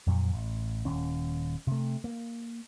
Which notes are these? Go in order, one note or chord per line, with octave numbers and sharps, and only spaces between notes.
F2 A#2 F#3
A1
D#1 D#2 C#4
C3 A3
A#3